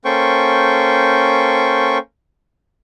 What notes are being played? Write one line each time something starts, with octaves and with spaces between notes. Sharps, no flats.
A#3 C#4 A4 C5 G5 C#6